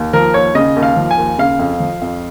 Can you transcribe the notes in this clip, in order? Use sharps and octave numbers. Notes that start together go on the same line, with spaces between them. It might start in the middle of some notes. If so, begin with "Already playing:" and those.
Already playing: D#2
F3 A#4
D#2 C#5
C#3 D#5
D#2
F5
F3
G#5
D#2
C#3 F5
F2
F3
F2